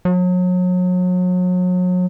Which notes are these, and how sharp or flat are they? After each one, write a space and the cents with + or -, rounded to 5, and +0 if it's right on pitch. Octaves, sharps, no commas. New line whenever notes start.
F#3 -35